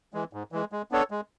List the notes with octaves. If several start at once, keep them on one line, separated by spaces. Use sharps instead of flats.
E3 G#3
G#2
E3 G#3
G#3
B3 D4 A4 C#5
G#3